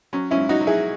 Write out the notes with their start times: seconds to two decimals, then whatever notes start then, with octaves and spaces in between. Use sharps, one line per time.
0.13 F#3 C#4
0.31 C#4 E4
0.37 G#2
0.49 D#4 F#4
0.61 F#3
0.67 E4 G#4